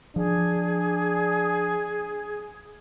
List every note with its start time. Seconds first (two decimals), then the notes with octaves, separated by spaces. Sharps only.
0.16 F3 D4 G#4